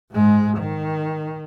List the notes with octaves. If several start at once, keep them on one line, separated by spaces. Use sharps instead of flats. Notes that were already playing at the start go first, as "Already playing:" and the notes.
G#2 G#3
D#3